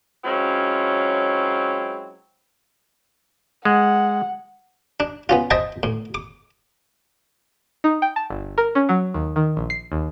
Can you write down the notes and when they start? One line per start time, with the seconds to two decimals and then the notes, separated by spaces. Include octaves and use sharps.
0.24 F#3 G#3 C4 C#4 E4 F4
3.65 G#3 F#5
5.00 D4
5.29 B3 C#4 F4
5.51 C5 D#5 E5 G5 A5
5.83 A2
6.14 D6
7.84 D#4
8.02 G5
8.16 A5
8.30 G1
8.58 A#4
8.75 C#4
8.89 F#3
9.14 D#2
9.36 D#3
9.57 A#1
9.70 C7
9.92 D#2